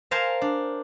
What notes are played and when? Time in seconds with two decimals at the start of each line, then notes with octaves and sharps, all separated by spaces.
0.11 A#4 C5 F5 G#5 A5
0.42 D4